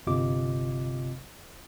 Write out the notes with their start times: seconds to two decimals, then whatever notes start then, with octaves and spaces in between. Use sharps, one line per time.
0.07 G1 C3 F4 D#5 D6